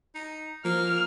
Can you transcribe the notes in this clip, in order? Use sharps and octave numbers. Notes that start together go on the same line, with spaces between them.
D#4
F3 A#3 F6